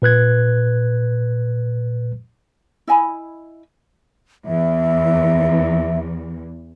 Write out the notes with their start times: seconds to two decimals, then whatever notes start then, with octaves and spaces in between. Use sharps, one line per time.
0.02 A#2 B4 F#6 G#6
2.87 E4 D#5 G#5 B5
4.46 E2 E5